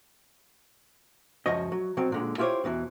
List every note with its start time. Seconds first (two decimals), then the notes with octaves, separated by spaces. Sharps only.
1.46 C#2 F#2 F3 F#4 C#5 D#5
1.72 F#3
1.97 B2 F#3 C4
2.12 A#2 D3 G#3
2.38 E4 F4 G4 G#4 C5 C#5
2.64 E2 B2 D3 E3